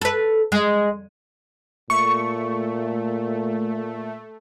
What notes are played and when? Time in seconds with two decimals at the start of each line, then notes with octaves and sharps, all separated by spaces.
0.01 A4 B4
0.52 G#3
1.90 A#2 A3 C#6